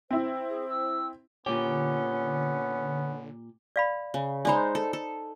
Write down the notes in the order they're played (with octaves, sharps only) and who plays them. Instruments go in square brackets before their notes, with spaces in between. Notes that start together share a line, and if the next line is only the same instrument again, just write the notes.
[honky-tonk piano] C4 E4 [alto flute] C5
[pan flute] G#4
E6
[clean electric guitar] A#2 G4 [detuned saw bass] D3 [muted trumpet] B3 [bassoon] C#4
[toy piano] D5 F5 B5
[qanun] C#3
[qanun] G#3 D#4 C5 [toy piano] D5 B5
[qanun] A4
A4